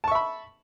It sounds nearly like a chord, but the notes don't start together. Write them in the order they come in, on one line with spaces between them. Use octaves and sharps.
A5 C#6 E5 B5